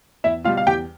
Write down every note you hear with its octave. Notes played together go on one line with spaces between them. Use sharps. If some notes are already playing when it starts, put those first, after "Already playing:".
E2 E4 E5
B2 G3 F4 F5
F5
E2 G4 G5